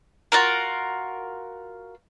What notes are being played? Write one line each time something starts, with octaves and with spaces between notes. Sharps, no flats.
F4 F#4 A#4